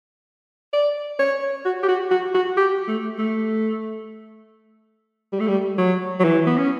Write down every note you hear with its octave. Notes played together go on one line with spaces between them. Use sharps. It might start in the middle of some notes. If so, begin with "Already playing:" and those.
D5
C#5
F#4
G4
F#4
F#4
F#4
G4
A3
A3
G3
A3
G3
F#3
F#3
E3
B3
C#4